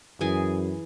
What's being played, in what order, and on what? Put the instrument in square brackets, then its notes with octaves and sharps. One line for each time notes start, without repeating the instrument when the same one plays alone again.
[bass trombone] F#2 [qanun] E3 G#4 G#5